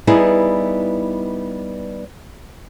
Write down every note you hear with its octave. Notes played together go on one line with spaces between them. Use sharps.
G3 B3 D#4 E4 G#4